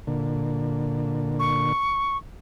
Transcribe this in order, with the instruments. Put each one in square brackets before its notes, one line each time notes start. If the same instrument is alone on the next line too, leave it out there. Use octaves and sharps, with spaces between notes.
[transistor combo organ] A#2 D3
[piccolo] C#6